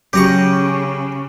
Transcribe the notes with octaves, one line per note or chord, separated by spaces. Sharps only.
C#3 F#3 C#4 G4 A#5 C#6